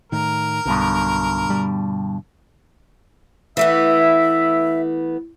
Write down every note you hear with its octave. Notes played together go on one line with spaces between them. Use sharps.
A2 D#3 A#4
B1 G2 B2 D3
G3
E3 A3 B3 E5